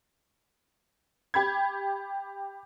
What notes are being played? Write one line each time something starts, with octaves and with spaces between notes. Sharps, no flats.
G4 B5 G#6